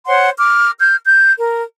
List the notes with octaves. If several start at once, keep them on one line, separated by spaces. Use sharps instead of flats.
C5 C#5 F#5 C6
D6 F6
F6 G6
G6
A#4